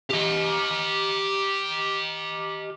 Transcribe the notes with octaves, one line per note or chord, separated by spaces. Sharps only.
G4 D#5